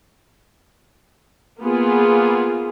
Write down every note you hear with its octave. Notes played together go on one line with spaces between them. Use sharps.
A#3 B3 F4 G#4